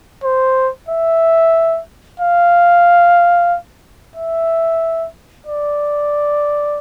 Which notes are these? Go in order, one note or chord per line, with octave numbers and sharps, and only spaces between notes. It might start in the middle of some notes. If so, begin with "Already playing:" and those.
C5
E5
F5
E5
D5